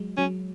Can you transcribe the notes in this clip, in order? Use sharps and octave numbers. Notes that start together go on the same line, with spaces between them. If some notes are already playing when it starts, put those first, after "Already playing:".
Already playing: F#3 G#3
F#3 C#4